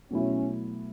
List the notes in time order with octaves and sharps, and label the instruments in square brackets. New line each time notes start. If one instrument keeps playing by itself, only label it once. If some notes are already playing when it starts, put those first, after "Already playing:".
[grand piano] B2 F#3 A3 E4 [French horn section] C#4